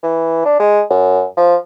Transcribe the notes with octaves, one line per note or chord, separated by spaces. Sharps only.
E3
D4
G#3
F#2
F3